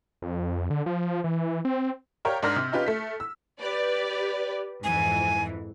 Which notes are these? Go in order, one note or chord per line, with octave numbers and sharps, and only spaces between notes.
F2
D3
F3
E3
C4
G4 A#4 C#5 D5 F5 G5
G#2 D4 A#4 F6 A#6
C3
C#4 D#4 F4 G4 B4
A3 B6
E6
G4 B4 D5
F2 G#2 E3 G#5